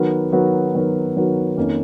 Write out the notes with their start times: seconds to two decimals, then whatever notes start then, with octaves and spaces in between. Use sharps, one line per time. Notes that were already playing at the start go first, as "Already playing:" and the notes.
Already playing: D#3 F#3 B3 F#4 A#4
0.32 D#3 F#3 B3 F#4 A#4
0.74 D#3 F#3 B3 F#4 A#4
1.16 D#3 F#3 B3 F#4 A#4
1.57 F2 D#3 A#3 C#4